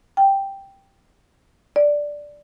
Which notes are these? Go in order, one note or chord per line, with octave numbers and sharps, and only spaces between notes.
G5
D5